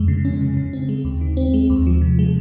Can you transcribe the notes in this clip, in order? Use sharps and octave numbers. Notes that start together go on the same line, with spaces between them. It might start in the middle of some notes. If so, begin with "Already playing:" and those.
Already playing: F2 G#3
C#3
C#4
C#3
C#3
C4
G#3
D#2
D#3
C4
G#3
D#2
F3
C3
G#3